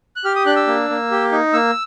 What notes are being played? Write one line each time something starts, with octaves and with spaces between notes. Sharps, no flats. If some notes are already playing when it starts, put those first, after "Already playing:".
F#6
G4 F6
D#6
D4 F#6
E6
A#3
A#3
G4
D#4
A#3 E6